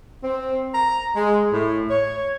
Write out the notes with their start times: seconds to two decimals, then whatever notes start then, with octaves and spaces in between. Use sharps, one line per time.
0.24 C4
0.74 A#5
1.15 G#3
1.52 A2
1.90 C#5